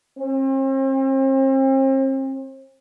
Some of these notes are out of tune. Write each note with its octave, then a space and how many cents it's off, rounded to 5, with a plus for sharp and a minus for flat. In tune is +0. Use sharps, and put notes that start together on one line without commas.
C4 +40